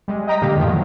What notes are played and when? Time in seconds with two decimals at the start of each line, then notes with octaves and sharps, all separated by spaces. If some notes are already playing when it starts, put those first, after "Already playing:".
0.08 G3 G#3
0.27 D#5 G5 A#5 D#6 B6
0.42 A#2 D3 A#3 G4 F5
0.56 F2 A2 D#3 F3
0.68 F#3